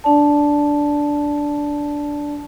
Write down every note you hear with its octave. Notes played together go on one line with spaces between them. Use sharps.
D4 D5 A5